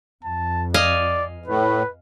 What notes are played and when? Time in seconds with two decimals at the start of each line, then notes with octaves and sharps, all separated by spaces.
0.24 F2 A5
0.74 D5 D#5 F5 G#5
1.47 A2 B4